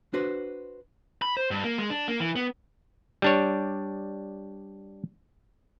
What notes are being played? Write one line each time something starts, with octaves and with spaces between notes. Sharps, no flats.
D4 F#4 B4 C5
B5
C5
G2
A#3
G#3
D4
A#3
E3
B3
G3 D4 C#5